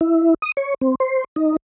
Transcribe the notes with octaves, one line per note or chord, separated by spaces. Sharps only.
E4
D#6
C#5
C4
C5
D#4